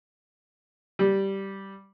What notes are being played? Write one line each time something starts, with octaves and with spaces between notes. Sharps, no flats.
G3